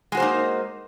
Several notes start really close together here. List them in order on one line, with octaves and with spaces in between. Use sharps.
G#3 F#4 C5 A#3 D#4